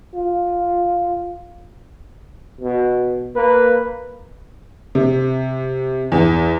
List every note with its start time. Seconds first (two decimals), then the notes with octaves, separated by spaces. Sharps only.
0.15 F4
2.61 B2
3.36 A#3 B4
4.95 C3
6.12 E2